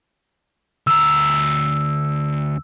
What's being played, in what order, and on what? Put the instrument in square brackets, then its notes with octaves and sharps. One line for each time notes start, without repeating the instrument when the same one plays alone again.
[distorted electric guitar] D2 A#5 [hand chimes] E6